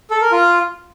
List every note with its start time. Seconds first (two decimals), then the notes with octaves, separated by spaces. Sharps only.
0.11 A4
0.21 A#4
0.32 F4